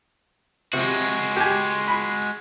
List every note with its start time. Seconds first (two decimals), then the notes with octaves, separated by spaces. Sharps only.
0.73 C3 G#3 F#4
1.37 G4 G#5
1.88 B5